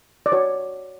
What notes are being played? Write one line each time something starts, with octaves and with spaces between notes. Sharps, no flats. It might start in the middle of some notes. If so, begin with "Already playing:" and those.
D5
F#4 B4 C#5